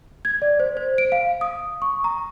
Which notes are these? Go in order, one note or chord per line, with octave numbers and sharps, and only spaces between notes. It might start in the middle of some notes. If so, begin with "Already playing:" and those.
G#6
D5
C5
C5
D7
F5
D#6
C#6
A#5